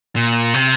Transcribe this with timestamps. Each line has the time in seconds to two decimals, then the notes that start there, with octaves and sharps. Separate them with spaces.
0.16 A#2
0.54 C3